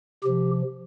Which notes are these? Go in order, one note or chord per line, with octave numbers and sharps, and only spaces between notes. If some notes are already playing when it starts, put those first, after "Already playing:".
C3 F3 G4